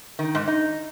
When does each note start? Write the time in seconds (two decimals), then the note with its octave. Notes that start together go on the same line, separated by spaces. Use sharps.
0.19 D#3
0.35 G#2
0.48 D#4